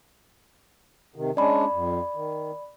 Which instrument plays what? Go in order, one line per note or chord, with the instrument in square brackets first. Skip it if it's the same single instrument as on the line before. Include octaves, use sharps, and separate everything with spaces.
[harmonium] C3 D#3
[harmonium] G#3 C#4 D4 [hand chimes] D5 B5
[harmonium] F2
D#3